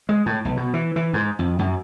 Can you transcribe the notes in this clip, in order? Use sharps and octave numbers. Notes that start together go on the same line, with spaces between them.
G#3
A2
B1
B2
E3
E3
G#2
F2
F#2